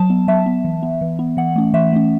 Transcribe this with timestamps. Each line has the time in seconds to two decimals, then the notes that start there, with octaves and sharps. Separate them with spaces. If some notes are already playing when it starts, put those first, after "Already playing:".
Already playing: F#3 A5
0.10 B3
0.28 F#3 E5
0.46 B3
0.65 E3
0.83 B3
1.01 E3
1.19 B3
1.37 E3 F#5
1.56 A3 C#4
1.73 E3 E5
1.92 A3 C#4